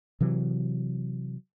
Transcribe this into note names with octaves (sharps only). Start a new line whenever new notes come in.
C3 E3 F#3